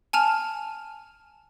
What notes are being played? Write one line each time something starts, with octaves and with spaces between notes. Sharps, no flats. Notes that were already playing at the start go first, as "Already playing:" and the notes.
G#5 A5 F6 F7